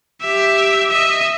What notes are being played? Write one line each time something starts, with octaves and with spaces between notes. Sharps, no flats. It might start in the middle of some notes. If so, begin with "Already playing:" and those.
G4 E5
D#5 E5